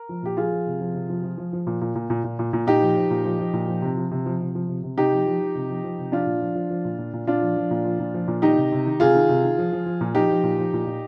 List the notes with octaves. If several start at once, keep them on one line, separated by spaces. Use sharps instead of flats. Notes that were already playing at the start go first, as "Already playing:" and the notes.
Already playing: A#4
F3
A#2 G4
F3 F4 G#4
F3
C3
F3
C3
F3
F3
F3
F3
A#2
A#2
A#2
A#2
A#2
A#2
A#2
A#2 D#4 G4
F3
F3
A#2
F3
F3
A#2
F3
C3
F3
C3
F3
C3
F3
C3
C3
C3 D#4 G4
F3
F3
F3
C3
F3
F3
C3
F3 D4 F4
A#2
F3
F3
F3
A#2
A#2
A#2
A#2 D4 F4
F3
F3
A#2
F3
A#2
F3
A#2
D#3 D#4 G4
C3
C3
D#3
C3 F4 G#4
D#3
C3
D#3
F3
F3
F3
A#2
F3 D#4 G4
F3
A#2
F3
A#2
A#2